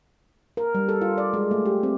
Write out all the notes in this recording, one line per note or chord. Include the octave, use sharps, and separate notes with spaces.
A#4
G3
A4
F4
D5
G#3
A3
G4
C4